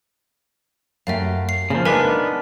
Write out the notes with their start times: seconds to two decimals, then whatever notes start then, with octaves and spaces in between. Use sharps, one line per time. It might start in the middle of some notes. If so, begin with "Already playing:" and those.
1.07 F#2 A3 G4 E5 F5
1.49 C7
1.70 C#3 F3 A#3
1.85 G#3 B3 D4 D#4 A#4 B4 G#5 B6